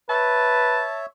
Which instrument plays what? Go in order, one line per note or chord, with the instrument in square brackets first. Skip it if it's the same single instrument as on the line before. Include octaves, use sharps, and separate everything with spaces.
[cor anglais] B4 [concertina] C#5 E5 [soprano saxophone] A5